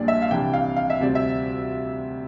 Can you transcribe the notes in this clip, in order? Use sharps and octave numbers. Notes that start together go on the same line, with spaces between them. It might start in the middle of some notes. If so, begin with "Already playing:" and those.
Already playing: A#1 A#2 G3 D4 D5
E5
F5
C2 C3 E3 G3 D4 G5
F5
F5
E5
D2 C3 G3 C4 D5
E5